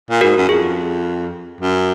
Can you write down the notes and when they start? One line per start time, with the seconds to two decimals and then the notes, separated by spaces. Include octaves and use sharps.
0.10 A#2
0.21 G#2 F#4 A#4
0.37 F#2
0.49 F2 G#4
1.61 F#2